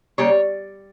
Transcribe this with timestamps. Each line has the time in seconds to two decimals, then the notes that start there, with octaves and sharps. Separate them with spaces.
0.18 C#3 G3 A#3 C#5